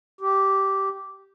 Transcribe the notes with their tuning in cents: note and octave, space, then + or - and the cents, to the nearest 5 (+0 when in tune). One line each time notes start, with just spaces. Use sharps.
G4 -10